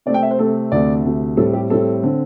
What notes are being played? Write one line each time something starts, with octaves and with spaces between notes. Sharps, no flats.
C3 A3 C4 D5
G5
E5
C5
C3 A3 C4 A4
D2 C3 A3 D5
D2 C3 A3
A2 G3 C4 A4
G4
A2 G3 C4 A4
D3 C4